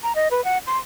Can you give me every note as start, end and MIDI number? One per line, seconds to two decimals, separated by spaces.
0.03 0.13 82
0.15 0.28 75
0.31 0.43 71
0.44 0.58 78
0.67 0.77 84